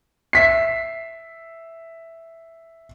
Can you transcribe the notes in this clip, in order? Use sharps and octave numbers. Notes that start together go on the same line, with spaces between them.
E5 B6 C7